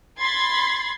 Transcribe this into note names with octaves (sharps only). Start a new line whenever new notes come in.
B5 C6 G#6 A6 C7